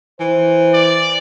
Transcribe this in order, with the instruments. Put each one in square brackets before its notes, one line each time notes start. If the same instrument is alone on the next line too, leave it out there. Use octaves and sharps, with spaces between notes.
[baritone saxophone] E3 [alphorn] C5
[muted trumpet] D5